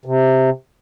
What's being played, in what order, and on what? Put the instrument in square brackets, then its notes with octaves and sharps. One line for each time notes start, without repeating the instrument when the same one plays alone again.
[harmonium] C3